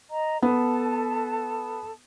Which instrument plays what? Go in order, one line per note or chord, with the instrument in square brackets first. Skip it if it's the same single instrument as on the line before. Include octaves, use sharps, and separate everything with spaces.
[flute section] D#5 A#5
[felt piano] B3 [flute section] A4 A5